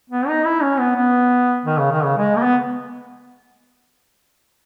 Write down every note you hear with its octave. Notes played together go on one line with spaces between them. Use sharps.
B3
D#4
E4
C#4
B3
B3
D#3
C#3
D#3
C#3
G#3
A#3
B3